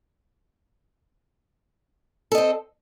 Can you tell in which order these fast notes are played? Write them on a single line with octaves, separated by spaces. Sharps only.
A4 D#5 C4